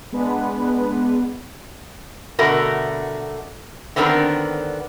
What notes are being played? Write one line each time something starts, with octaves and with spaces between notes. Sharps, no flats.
G#3 B3 D4 B4
B2 D3 A3 F#4 A#4
D3 D#3 B3 C4 D4 A#4